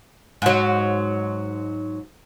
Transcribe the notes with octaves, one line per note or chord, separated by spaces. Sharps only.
G#2 F#3